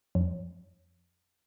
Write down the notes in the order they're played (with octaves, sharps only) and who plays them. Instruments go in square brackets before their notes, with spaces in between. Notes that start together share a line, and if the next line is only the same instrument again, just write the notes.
[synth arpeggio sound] F2